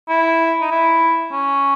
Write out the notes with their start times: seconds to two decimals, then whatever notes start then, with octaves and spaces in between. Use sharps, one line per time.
0.09 E4
0.61 D#4
0.71 E4
1.32 C#4